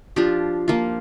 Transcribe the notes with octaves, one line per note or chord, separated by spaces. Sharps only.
F3 D4 F4 G4
F3 A#3 F4